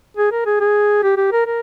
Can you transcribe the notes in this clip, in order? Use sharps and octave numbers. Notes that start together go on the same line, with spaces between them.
G#4
A#4
G#4
G#4
G4
G4
A#4
A#4